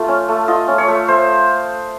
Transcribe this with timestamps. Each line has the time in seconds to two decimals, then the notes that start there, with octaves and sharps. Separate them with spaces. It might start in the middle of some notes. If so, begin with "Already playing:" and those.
Already playing: A3 F4
0.08 C#4
0.28 A3
0.48 F4 D#5
0.68 C#4
0.78 C#5
0.88 A3
1.08 A3 C5